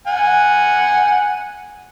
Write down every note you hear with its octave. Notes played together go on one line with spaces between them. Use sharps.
F#5 G#5